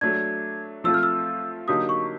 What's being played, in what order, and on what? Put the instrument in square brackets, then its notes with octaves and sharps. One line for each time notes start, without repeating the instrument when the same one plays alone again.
[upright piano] F#3 A3 D4 [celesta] G#6
[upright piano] F3 A3 C4 F4 [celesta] E6
[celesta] F6
E6
[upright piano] D3 F#3 A#3 D#4 G4 [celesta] D#6
[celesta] C#6